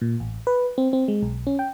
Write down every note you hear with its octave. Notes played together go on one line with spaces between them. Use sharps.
A#2
A1
B4
C4
C4
G#3
B1
C#4
G5